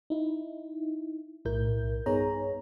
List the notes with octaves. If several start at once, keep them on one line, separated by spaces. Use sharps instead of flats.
D#4 E4
B1 A2 E4 A#4 G6
G2 B3 D#4 G#4 C#5 A#5